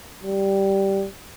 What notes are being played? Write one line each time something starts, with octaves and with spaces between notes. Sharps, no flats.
G3